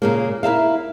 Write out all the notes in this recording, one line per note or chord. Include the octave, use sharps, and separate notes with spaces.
A#2 C#3 A#3
E4 A#4 E5 F5